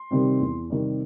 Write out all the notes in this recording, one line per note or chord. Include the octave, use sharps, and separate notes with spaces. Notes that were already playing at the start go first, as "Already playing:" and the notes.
Already playing: C6
C3 D#3 G3 C4
E2
C3 D#3 G3 C4